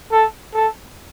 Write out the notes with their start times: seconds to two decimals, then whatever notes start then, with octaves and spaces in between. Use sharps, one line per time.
0.12 A4
0.54 A4